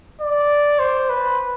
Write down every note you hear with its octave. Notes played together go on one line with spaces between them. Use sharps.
D5
C5
B4